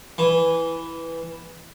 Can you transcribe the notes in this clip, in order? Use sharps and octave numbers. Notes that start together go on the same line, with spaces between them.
E3